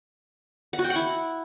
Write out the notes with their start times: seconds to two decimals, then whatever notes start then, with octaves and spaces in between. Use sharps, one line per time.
0.73 F#5
0.79 F#4
0.84 G5
0.90 F#5
0.96 E4